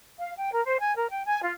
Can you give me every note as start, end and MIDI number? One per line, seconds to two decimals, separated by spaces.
0.19 0.31 77
0.37 0.51 79
0.52 0.62 70
0.64 0.79 72
0.79 0.93 80
0.96 1.07 70
1.10 1.22 79
1.25 1.42 80
1.42 1.52 65